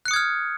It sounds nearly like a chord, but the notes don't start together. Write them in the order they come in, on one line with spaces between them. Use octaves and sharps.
F#6 C#7 D#6 G#6 F6